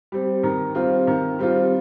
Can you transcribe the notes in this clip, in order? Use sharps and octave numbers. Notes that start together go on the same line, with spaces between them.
G3 C4
D#3
G3 C4 F4
D#3
G3 C4 F4